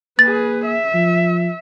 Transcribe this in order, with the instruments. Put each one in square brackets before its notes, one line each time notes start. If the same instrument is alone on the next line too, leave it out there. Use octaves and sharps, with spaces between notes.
[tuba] A#3 [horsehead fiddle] G#4 B4 [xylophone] A6
[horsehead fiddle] E5
[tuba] F3